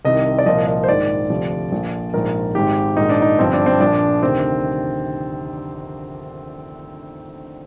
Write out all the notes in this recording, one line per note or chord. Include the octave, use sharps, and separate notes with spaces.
C2 C3 D#3 D#5
D5
C2 A#2 F3 D#5
D#5
C5
A#1 G#2 D#3 D5
D2 C3 F3
A#1 A#2 F3
A#1 G#2 F3 A#4
G#1 G#2 D#3 G4
A#1 G#2 D#3 D#4
D4
D#4
G1 G2 F3 C4
D4
C4
A#1 A#2 F3 D4
D2 C3 D#3 C4